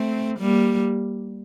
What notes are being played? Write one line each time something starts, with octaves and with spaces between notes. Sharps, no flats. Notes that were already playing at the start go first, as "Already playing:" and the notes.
Already playing: A3 C4
G3 A#3